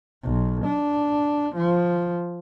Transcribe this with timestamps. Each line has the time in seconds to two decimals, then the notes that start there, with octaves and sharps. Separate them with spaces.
0.23 B1
0.65 D4
1.56 F3